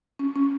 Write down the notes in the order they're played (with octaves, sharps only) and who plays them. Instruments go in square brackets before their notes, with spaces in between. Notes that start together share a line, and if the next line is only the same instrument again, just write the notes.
[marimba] C#4
C#4